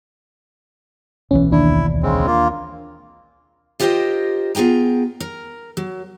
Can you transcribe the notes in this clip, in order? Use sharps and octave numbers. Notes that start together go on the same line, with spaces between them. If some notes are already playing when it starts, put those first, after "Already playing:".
D1 B1 E3 C#4
D#2 D4 E4
C#3 G#3 C4
A#3 F4
F4 G4 A#4 C5 D#5 G5
B3 F4 G#4 G5 A#5
A#4
F#3